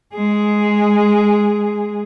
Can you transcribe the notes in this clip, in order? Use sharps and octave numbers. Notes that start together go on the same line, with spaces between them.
G#3 G#4